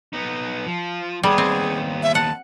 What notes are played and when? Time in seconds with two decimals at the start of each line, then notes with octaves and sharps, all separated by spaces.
0.13 B3 D#4
0.66 F3
1.23 D#2 G3 B3 G#4
1.38 C4
2.03 E5
2.15 F#5 A5